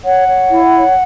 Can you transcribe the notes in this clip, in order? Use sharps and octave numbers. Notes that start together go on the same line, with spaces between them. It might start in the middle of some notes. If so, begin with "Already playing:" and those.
C#5 F#5
C#5
E4
C#5